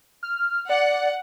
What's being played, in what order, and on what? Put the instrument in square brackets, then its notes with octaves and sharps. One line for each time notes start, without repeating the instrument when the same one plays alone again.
[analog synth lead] F6
[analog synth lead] D5 [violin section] F#5